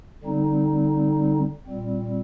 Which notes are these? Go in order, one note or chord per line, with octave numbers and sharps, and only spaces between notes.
D3 G3 C4 D#4
A#2 G3 C4